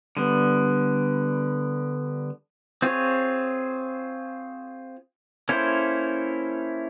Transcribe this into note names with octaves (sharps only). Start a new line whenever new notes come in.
D3 G3 B3
C4 F4 G#4 C#5
A#3 C#4 E4 A4 C5